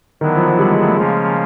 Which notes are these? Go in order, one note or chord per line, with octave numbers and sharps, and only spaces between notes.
D3 D#3 F#3 B3 E4
F3
F3
G3
G#3
A3
C#3 F3 G#3 A#3 C#4